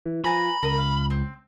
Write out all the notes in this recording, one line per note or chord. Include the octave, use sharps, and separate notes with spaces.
E3
F3 B4 G#5 A#5 B5
C#2 A#4 D#5
F5
C4